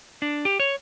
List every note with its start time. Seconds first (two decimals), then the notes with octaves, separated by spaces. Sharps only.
0.22 D4
0.45 G4
0.60 C#5